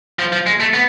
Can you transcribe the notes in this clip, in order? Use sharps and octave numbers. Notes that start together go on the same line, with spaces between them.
F3
F3
G#3
A3
B3